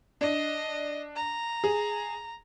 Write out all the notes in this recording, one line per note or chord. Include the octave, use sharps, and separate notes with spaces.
D4 D#5
A#5
G#4